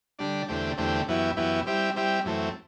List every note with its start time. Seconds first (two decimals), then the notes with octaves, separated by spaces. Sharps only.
0.19 D3 G3 D4
0.48 E2 D3 A3 C4 G4
0.78 E2 D3 A3 C4 G4
1.08 F#2 E3 B3 E4 G4
1.37 F#2 E3 B3 E4 G4
1.66 G3 C4 E4 G4
1.96 G3 C4 E4 G4
2.25 F#2 E3 A3 C4